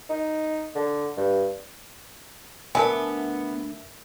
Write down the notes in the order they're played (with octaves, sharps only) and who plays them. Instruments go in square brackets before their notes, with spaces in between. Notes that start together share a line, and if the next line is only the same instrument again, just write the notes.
[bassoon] D#4
D3
G2
[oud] D2 D4 [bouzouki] B3 [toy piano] A#4 G#5 [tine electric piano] E5